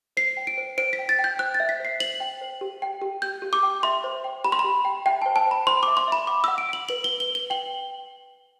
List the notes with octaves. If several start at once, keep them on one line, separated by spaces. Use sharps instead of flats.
C5 C7
G5
D7
C5
C5 D7
B6
G5
A6
G5
G6
C5 F#6
A6
E5
B6
C5 C7
C5 F#7
G5
C5
G4
G5
G4
G4 G6
G4
D6
G5
E5 C6
C5
G5
G4 B5
C6
B5
G4
G5
E5 G5
C5 A5
A5
C5 B5
C5 C6
E5 D6
C6
E5 B5
F#5 D6
F#5 E6
D7
F#5 F#7
B4 F#7
G7
B4
G7
B4 G7
G5 F#7